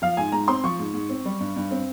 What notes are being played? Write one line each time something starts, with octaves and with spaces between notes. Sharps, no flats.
F3 F5
G#2 G#5
G#2 A#5
C4 C6
F3 C#6
G#2
G#2
C4
G3
G2
G2
C4